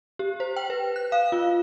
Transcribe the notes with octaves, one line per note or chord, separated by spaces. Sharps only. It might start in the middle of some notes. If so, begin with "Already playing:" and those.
G4
C5
G5
B4
F#6
F5
F4